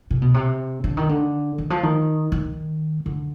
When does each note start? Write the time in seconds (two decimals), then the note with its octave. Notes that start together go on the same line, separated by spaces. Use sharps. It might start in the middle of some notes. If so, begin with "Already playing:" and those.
0.11 C3
0.22 B2
0.34 C3
0.84 D3
0.97 D#3
1.09 D3
1.58 D#3
1.70 F3
1.83 D#3
2.32 D#3
3.06 D3